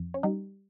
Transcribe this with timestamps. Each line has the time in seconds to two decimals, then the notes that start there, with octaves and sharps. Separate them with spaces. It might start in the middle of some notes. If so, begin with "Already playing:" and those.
Already playing: F2
0.14 C#4
0.23 G3 D#4